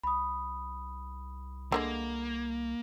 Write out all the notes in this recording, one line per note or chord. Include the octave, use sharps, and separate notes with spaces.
C2 B5 D#6
D3 F#3 G#3 A#3